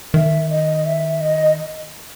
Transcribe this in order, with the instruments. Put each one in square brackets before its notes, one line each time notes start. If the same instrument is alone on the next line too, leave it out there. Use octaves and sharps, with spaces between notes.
[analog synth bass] D#3 [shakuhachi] E5
[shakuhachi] D#5
E5
D#5